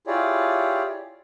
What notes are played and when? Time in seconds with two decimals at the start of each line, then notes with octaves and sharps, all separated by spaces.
0.07 E4 F4 G4 G#4 C#5 D5